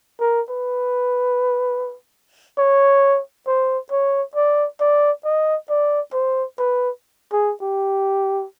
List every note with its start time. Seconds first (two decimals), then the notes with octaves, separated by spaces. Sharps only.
0.20 A#4
0.50 B4
2.58 C#5
3.47 C5
3.91 C#5
4.35 D5
4.80 D5
5.25 D#5
5.70 D5
6.13 C5
6.59 B4
7.32 G#4
7.62 G4